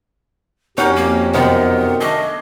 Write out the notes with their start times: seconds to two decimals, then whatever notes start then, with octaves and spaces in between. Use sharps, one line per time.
0.78 F2 C#4 D#4 F#4 G4 A#4 G5
0.96 A#3
1.33 F#2 C3 D#3 B3 A#4 D#5 F5
2.00 A3 D4 G#4 D#5